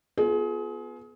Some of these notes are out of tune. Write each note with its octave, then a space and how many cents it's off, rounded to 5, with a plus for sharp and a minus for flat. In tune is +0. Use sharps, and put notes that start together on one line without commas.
B3 +0 F4 +10 G#4 +30